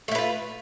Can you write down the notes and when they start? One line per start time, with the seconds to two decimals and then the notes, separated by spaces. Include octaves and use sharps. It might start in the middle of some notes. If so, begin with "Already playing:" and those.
0.08 A3
0.12 E4
0.15 B4
0.18 F4